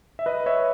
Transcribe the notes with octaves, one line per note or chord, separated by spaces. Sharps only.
E5
B4 D#5
C#5 E5